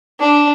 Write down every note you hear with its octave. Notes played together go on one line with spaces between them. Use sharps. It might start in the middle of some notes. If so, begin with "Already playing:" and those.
D4